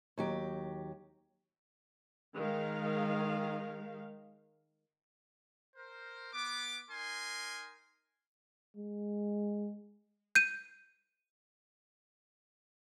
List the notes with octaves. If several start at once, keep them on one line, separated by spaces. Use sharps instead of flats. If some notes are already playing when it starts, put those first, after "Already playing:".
D#2 F#3 G4
D#3 G#3 F5
A#4 C5
B3 D6
D#4 A#4 G#5 C6
G#3
G6 D#7